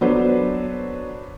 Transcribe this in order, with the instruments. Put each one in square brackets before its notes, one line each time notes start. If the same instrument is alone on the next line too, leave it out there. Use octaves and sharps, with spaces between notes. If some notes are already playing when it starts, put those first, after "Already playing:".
[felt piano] F#3 B3 D4 A4 B4 C5